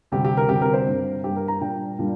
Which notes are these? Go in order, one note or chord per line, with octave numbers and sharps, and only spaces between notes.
D2 C3 G3 C4 G4
G4
A#4
D2 C3 G3 C4 G4
A#4
C5
G2 G3 A#3
G2 G3 A#3 G4
A#4
A#5
A#2 G3 D4 G5
A#2 G3 D4